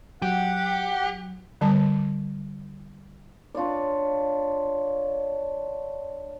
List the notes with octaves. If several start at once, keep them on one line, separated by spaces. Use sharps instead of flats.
F#3 G4 F#5
D3 G3 A5
D4 F4 C#5 D5